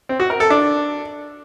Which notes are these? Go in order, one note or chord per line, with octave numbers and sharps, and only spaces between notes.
C4
F#4
A#4
A4
D4